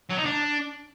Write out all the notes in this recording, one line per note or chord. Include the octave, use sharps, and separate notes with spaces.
F#3
D#4
D4